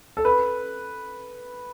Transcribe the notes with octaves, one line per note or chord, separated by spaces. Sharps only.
A4
B4